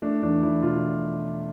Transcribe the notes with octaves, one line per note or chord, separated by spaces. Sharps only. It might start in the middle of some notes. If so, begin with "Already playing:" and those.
A3 D4
E2 D4
E2 E4
B2 F4